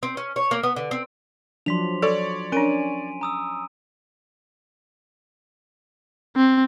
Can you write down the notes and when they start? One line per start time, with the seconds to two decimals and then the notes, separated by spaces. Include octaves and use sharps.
0.03 C4
0.17 C#4
0.36 C#5
0.51 A#3
0.63 B3
0.76 D3
0.91 C4
1.66 F3 F#3 D4 C6 B6 F7
2.02 A4 C#5 D5 C#6
2.52 C#4 D4 A#4 G#5 D7 D#7
3.21 A#5 D#6 E6
6.36 C4